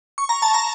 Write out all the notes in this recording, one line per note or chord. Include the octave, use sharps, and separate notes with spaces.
C#6
A#5
A5
A#5